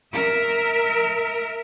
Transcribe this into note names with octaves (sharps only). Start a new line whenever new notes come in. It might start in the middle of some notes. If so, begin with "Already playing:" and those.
A#4 E5